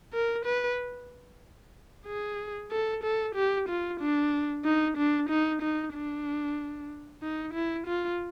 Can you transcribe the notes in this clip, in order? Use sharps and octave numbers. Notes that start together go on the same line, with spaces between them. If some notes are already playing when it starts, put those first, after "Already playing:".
A#4
B4
G#4
A4
A4
G4
F4
D4
D#4
D4
D#4
D#4
D4
D#4
E4
F4